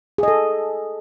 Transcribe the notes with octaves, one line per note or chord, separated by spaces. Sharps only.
G#4 A4 D#5